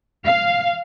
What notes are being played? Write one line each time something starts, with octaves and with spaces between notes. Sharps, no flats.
F5